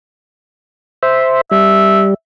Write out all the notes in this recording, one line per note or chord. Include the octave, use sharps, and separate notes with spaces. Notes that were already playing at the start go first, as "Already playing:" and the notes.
C5 E5
G3 E5